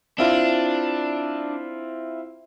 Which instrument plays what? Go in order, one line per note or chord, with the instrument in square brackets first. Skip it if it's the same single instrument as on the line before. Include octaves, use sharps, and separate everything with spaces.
[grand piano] C4 E4 F4 [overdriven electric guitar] D4